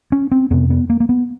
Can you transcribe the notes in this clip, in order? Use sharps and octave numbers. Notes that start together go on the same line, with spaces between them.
C#4
C4
F2 C3 B3
B3
A#3
A#3
B3